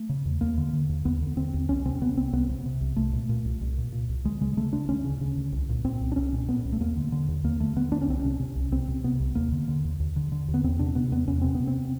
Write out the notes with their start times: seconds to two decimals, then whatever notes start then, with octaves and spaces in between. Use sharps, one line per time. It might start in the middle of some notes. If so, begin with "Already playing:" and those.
Already playing: A3
0.09 C#3
0.25 E2
0.41 D#2 A#3
0.58 D3
0.73 D3
0.89 D#2
1.05 D#2 B3
1.21 D3
1.37 D3 C4
1.54 D#2
1.69 C2 C#4
1.85 C3 C4
2.01 C3 B3
2.17 C2 C4
2.33 C2 B3
2.50 C3
2.66 C3
2.81 C2
2.96 C2 A3
3.13 A#2
3.29 A#2
3.45 C2
3.61 C2
3.78 A#2
3.92 A#2
4.09 C2
4.24 D2 G#3
4.41 C#3 G#3
4.57 C#3 A3
4.72 D2 D4
4.88 D2 C#4
5.05 C#3
5.21 C#3
5.36 D2
5.52 C2
5.69 A#2
5.85 A#2 C4
6.00 C2
6.12 D4
6.16 C2 C#4
6.33 A#2
6.48 A#2 B3
6.65 C2
6.72 A3
6.80 D#2 A#3
6.96 D3
7.12 D3
7.28 D#2
7.44 D#2 A#3
7.60 D3 A3
7.76 D3 B3
7.92 D#2 D4
8.02 C#4
8.08 C2 C4
8.19 C3 C#4
8.39 C3
8.56 C2
8.71 C2 C4
8.88 C3
9.04 C3 B3
9.20 C2
9.35 D#2 A#3
9.52 D3
9.68 D3
9.84 D#2
10.00 D#2
10.16 D3
10.32 D3
10.48 D#2
10.54 B3
10.64 E2 C4
10.79 C3 D4
10.95 C3 B3
11.11 E2 B3
11.28 E2 C#4
11.41 C3 C4
11.55 C3 B3
11.67 C4